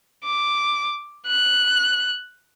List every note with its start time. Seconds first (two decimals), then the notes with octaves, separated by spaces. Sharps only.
0.24 D6
1.26 F#6